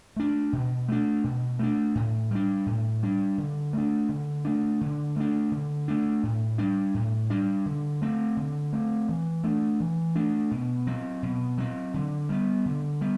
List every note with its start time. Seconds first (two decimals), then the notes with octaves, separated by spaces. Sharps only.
0.16 A3 D4
0.53 B2
0.88 A3 D4
1.24 B2
1.59 A3 D4
1.95 A2
2.31 G3 D4
2.66 A2
3.03 G3 D4
3.38 D3
3.73 A3 D4
4.09 D3
4.45 A3 D4
4.81 D3
5.16 A3 D4
5.52 D3
5.88 A3 D4
6.23 A2
6.58 G3 D4
6.94 A2
7.30 G3 D4
7.66 D3
8.02 A3 C4
8.37 D3
8.73 A3 C4
9.09 E3
9.44 A3 D4
9.80 E3
10.15 A3 D4
10.51 B2
10.87 F#3 C4
11.23 B2
11.58 F#3 C4
11.94 D3
12.29 G3 B3
12.66 D3
13.01 G3 B3